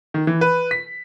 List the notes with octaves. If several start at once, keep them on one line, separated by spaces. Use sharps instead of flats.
D#3
E3
B4
B6